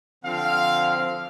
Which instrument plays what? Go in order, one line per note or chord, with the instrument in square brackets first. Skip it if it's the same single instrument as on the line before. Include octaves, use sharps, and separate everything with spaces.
[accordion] D3 F3 C4 [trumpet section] F5